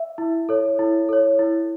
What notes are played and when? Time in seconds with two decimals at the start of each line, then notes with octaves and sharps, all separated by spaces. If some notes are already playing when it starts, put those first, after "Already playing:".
Already playing: E5
0.18 E4
0.49 A4 C#5
0.79 E4
1.09 A4 C#5
1.39 E4